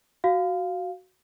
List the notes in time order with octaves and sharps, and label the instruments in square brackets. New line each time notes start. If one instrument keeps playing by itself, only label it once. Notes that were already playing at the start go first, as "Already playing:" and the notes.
[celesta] F#4 F5